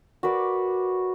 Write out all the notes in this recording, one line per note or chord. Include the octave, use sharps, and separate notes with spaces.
F#4 A#4 B4 D5